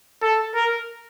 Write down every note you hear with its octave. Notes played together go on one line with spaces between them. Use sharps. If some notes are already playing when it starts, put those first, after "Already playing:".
A4
A#4